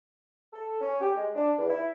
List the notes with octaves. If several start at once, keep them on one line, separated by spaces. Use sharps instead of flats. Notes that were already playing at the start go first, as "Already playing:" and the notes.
A4
C#4
G4
G#3
D4
E2
E4